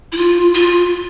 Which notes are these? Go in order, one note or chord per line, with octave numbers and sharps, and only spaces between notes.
E4
F4
F4